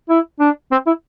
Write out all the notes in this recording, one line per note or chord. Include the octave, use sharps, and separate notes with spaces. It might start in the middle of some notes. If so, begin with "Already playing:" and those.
E4
D4
C4
E4